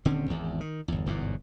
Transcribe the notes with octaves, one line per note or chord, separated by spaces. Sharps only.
D#1 D3 C4 C#4
G#1 E2
D#3
G1 E2
G1 E2 G#2 B2